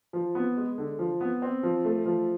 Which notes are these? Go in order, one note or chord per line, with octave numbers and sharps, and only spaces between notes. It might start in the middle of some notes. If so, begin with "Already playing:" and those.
F3
B3
G#3
D3
F3
B3
C4
F3
A3
F3